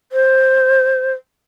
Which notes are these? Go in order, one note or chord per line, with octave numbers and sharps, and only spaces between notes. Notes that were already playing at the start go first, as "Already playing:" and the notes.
C5